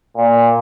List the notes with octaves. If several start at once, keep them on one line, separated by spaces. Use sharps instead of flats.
A#2